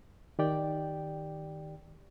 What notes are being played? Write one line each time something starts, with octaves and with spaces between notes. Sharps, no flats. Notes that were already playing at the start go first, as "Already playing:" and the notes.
D#3 G4 D5 G5